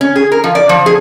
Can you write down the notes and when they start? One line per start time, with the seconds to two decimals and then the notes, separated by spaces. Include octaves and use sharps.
0.01 C#4
0.16 G#4
0.32 A#4
0.44 F3
0.55 D5
0.69 F3
0.86 G#4